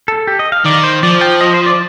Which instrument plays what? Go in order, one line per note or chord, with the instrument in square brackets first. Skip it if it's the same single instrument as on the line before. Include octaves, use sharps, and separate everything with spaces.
[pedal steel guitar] A4
G4
D#5
F5
[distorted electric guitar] D#3 [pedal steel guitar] D5
[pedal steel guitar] C5
[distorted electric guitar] F3 [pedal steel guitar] D5
[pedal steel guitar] G5
D#5
C5
D5